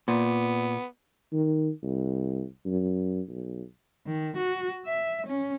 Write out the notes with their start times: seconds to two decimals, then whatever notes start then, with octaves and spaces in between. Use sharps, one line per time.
0.08 A#2 B3
1.32 D#3
1.83 C2
2.66 F#2
3.29 B1
4.07 D#3
4.37 F#4
4.85 E5
5.27 C#4